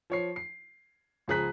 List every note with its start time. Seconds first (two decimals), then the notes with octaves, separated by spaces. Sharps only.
0.10 F3 C#5 C7
0.36 C7
1.28 C#2 F3 G#4 A#5 F#6 B6